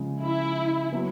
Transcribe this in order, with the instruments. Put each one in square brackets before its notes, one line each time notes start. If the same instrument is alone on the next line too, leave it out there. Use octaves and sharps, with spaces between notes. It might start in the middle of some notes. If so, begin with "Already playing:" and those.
Already playing: [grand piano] C#3 F3 G#3
[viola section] E4
[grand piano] F#3 B3